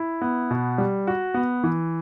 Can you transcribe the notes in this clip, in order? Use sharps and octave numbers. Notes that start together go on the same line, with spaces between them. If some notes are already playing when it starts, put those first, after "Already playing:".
Already playing: E4
B3
B2
G3
F#4
B3
E3